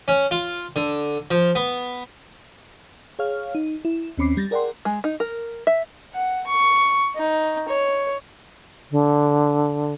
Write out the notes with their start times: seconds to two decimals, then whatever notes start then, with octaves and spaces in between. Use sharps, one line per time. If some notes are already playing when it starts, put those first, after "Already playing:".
0.08 C#4
0.31 F4
0.76 D3
1.31 F3
1.55 B3
3.19 G#4 C#5 F5 F6
3.55 D#4
3.85 E4
4.18 D#2 C4 C#4 B5 D6 C7
4.37 G3 A6 A#6
4.51 G#4 A#4 D5 F#5 G5 C6
4.85 G#3
5.04 D#4
5.20 A#4
5.67 E5
6.14 F#5
6.47 C#6
7.16 D#4
7.69 C#5
8.91 D3